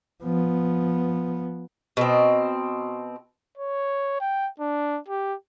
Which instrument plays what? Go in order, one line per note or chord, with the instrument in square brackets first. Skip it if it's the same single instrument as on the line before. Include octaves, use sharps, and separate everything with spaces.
[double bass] F3 B3
[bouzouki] B2 C4
[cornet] C#5
G5
D4
G4